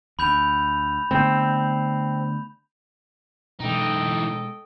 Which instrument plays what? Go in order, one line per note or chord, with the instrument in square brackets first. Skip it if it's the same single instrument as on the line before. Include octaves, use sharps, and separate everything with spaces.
[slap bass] D2 [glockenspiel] B5 G6 F7
[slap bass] D3 A3 B3 [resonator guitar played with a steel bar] C4
[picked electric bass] B2 G#3 [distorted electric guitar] E3 D#4 [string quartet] A4 D#5 G5